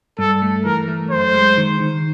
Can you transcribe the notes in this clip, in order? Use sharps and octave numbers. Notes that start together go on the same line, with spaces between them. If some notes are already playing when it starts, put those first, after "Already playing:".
G2 A4
A3
E3 A#4
A3
F#2 C5
G#3
D#3
D#3